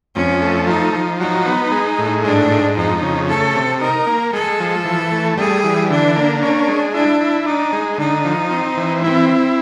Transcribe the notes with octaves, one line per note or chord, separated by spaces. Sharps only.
F2 C#4
A3
F3 D#4
F3
F#3 D#4
B3
G#3
A2
G#2 D4
G#2
F2 D#4
C#3
A3 A4
C3
D#4 A#4
A#3
G#3 A4
F3
E3
A3
G3 G#4
E3
D3 D4
A#3
C#4 D4
G#3
D4 E4
E4
D4 D#4
G#3
D3 D#4
F3
C4
E3
C4 E4
E4